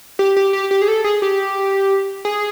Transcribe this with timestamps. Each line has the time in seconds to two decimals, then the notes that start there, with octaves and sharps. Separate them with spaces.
0.19 G4
0.36 G4
0.53 G4
0.71 G4
0.82 G#4
0.88 A4
1.04 G#4
1.22 G4
2.25 G#4